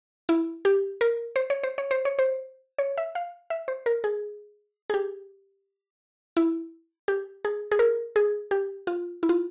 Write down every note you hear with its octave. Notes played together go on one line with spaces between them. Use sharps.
E4
G4
A#4
C5
C#5
C5
C#5
C5
C#5
C5
C#5
E5
F5
E5
C5
A#4
G#4
G#4
G4
E4
G4
G#4
G#4
A#4
G#4
G4
F4
E4
F4